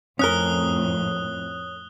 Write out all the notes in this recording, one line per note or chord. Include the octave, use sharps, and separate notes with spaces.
F2 A2 C#4 A#4 D#6 F#6 G7